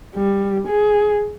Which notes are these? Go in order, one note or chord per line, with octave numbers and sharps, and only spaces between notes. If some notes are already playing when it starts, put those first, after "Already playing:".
G3
G#4